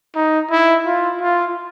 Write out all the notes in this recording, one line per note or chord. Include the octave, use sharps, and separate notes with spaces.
D#4
E4
F4
F4